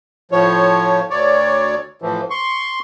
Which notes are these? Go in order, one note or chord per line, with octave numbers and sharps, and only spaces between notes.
A2 F3 C#5
D2 C#5 D5
A2 E3 F3
C6 C#6